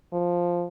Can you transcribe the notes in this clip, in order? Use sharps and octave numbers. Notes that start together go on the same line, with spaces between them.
F3